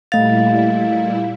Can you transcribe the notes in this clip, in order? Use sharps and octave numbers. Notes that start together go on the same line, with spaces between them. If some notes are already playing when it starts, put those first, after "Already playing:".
A#2 G3 A3 E4 F5 A6